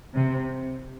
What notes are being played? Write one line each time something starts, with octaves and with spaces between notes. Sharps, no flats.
C3